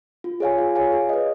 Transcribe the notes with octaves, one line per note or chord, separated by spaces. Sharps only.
F4
G#4 C#5 F5 G#5
F4
G#4 C#5 F5 G#5
G#4
B4 D#5